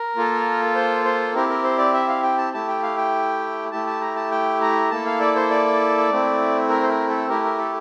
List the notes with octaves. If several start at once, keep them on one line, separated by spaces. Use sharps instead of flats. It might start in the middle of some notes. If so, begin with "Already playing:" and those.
Already playing: A#4
A#3 F4 A4
C5
C5
C4 E4 G4 A#4
A#4
C5
D5
E5
F5
G5
A5
A3 E4 G4 A5
G5
F5
G5
A3 E4 G4 A5
A5
A#5
A5
G5
A#5
A#3 E4 A4 A5
F5
D5
C5
D5
A3 C4 E4
A#4
C5
A#4
A4
A3 E4 G4 A#4
A#4
A4